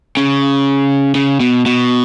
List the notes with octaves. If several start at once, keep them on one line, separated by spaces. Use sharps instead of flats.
C#3
C#3
B2
B2